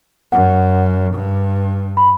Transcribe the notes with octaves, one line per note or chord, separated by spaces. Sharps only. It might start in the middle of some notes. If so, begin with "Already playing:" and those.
F#2 F#5
G2
B5